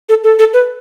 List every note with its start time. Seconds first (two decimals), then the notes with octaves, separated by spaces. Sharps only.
0.09 A4
0.24 A4
0.39 A4
0.53 B4